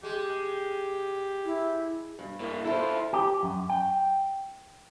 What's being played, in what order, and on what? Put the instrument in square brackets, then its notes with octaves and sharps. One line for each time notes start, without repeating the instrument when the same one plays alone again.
[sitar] G#3 [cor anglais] G4
[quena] E4
[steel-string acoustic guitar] G2
[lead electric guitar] A#3 E4
[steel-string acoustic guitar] E4 F4 [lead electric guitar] A4 C5
[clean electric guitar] G4
F#2
G5